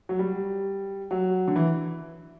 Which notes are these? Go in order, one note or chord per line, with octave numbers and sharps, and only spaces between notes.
F#3
G3
F#3
D3
E3